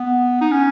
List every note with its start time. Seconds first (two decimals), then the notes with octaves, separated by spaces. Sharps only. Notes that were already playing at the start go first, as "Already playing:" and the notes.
Already playing: B3
0.41 D#4
0.51 C#4